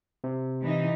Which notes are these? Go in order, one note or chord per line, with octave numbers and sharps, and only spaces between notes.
C3
E3 D#4